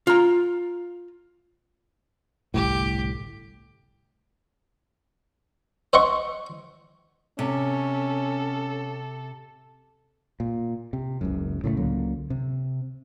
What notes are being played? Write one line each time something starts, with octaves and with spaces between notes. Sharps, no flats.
F4 A#5
G1 C2 A2 G4
C5 D#5 E5 F#5 C6 C#6
C3 C#4 A4
A#2
C3
F#1 C#2 F#2
A2 C#3 G#3 A3
C#2 D3 F#3 A#3
C3